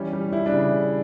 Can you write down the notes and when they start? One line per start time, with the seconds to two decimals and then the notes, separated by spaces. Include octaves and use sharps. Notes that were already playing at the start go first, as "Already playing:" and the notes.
Already playing: E3 G3 C#4
0.13 G3
0.32 G3 E4
0.46 D4
0.52 C#3